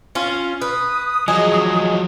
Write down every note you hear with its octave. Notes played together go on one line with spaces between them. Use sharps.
C#4 F4
B4 D#6
F3 F#3 G#4 D#5